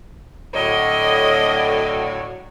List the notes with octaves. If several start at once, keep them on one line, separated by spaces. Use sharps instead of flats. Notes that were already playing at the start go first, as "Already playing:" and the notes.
A2 D3 F#3 D#5